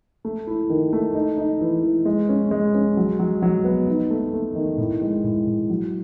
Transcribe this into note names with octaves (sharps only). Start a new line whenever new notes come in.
A3
E4
D#3
A3
D#4
D#4
E3
E3
G#3
C#4
G#3
C#4
F#3
F#3
F#3
B3
D#4
A3
A3
D#3
A2
G#3
A2
A2
F#3